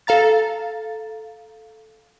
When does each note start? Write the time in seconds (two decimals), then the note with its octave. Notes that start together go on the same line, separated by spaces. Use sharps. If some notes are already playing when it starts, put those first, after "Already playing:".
0.07 A4 F5 A#5 A6